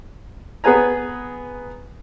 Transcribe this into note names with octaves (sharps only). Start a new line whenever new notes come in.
B3 G#4 B4 G#5 A#5